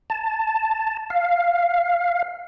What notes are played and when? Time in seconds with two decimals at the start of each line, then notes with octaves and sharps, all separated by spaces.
0.10 A5
1.10 F5